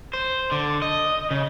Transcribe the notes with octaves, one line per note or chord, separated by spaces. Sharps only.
C5
D3
D#5
C#3